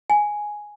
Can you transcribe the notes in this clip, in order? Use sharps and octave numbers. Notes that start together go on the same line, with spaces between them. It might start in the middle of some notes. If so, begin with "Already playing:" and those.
G#5